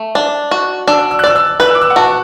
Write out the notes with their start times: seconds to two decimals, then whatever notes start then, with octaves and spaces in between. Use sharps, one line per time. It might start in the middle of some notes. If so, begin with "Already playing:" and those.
Already playing: A3
0.15 D4
0.51 F#4
0.88 D4 E6
1.11 E6
1.19 F#6
1.24 D5 E6
1.36 E6
1.60 B4 F#6
1.67 E6
1.75 D6
1.82 E6
1.90 F#5
1.96 F#4 A5